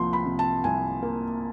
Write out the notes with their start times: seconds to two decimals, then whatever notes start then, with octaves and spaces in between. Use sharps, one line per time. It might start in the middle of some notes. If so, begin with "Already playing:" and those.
Already playing: C2 F3 A#3 C6
0.13 B5
0.26 C3
0.39 A5
0.64 C2 G#5
1.02 A#3